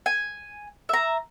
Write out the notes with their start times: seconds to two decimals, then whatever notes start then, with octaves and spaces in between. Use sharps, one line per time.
0.06 G#5
0.89 E5 A#5